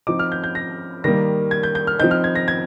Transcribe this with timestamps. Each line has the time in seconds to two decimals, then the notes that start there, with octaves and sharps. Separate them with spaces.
0.07 F3 C4 D#4 D6
0.19 F6
0.32 G6
0.44 G6
0.55 A#6
1.04 D#3 G3 A#3 A#6
1.51 G#6
1.63 G6
1.75 G6
1.87 F6
1.99 F3 C4 D#4 G6
2.11 F6
2.24 G#6
2.35 A#6
2.48 G#6